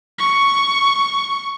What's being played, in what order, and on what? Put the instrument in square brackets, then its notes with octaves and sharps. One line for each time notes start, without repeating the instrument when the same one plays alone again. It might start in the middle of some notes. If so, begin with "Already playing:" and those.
[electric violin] C#6